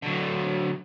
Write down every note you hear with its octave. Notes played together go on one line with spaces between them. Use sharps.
D3 F#3